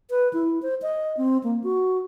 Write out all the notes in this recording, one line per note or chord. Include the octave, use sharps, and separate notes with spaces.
B4
E4
C5
D#5
C4
A#3
F#4